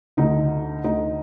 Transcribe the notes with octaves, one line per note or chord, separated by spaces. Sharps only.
D2 D3 D#4
D2 D3 D#4